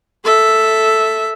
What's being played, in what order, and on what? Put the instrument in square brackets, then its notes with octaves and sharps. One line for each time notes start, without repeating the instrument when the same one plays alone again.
[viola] A4 E5